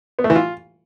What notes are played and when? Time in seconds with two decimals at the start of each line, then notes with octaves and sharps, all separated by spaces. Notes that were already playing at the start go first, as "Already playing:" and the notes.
0.19 B3
0.24 A3
0.30 E3
0.36 F4